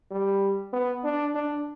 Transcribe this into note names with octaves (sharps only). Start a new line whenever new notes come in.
G3
B3
D4
D4